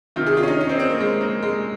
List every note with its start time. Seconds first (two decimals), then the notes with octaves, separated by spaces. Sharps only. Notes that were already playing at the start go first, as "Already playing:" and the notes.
0.16 C3 D#3 F4
0.26 G#4
0.37 F4
0.43 C#4
0.48 D#4
0.61 C#4
0.69 C4
0.79 C4
0.89 A#3
1.00 G#3
1.21 A#3
1.42 G#3